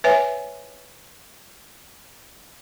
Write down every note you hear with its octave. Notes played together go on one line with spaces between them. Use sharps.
B4 C#5 E5 G#5